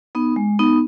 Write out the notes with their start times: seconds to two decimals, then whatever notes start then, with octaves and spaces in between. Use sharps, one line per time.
0.15 B3 D#4
0.36 G#3
0.59 B3 D#4